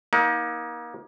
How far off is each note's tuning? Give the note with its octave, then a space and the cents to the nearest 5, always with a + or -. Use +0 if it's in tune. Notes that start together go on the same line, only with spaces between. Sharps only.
A#3 +35 D#4 +30